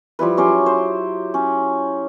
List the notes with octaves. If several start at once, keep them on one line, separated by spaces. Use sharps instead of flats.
F3 G3 E4 B4
F#3 C#4 G4 C5
C5
C#4